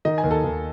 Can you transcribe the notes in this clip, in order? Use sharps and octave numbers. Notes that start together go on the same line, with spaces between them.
D#3 D#5
G#5
D#2
A4
D#2